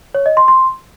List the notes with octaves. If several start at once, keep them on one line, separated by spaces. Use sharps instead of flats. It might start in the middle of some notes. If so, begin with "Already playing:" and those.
C#5
D#5
C6
C6